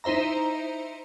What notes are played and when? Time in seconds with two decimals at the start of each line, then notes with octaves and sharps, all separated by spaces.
0.04 D#4 E4 C5 E5 A#5